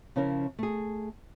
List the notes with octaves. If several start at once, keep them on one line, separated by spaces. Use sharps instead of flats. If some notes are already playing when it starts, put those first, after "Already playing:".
C#3 F3 C#4 E4 A#4
A3 G#4